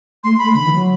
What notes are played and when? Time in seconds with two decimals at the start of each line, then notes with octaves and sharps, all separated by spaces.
0.24 A3 C6
0.38 B5
0.43 A3
0.54 D3 B5
0.64 E3
0.74 F#3